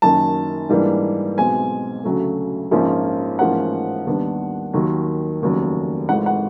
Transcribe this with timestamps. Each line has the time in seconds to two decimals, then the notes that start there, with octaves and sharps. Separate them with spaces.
0.02 F#1 F#2 D#3 A5
0.69 G#2 E3 G3 A#3 D4
1.38 B1 B2 G#3 C4 G#5
2.04 D2 C#3 F#3 A3
2.71 A#1 G#2 F3 A#3 C#4
3.39 A1 G#2 F3 A#3 C#4 F#5
4.07 D#2 D#3 G3 B3 D4
4.73 D#2 D#3 F#3
5.42 F1 D#2 C#3 F#3
6.09 G#1 G#2 E3 A3 F#5
6.26 F#5